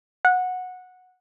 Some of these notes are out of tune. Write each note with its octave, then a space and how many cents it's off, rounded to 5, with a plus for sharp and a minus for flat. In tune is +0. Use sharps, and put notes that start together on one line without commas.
F#5 -15